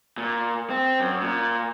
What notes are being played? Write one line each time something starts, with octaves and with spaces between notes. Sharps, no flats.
A#2
C4
F#2
A#2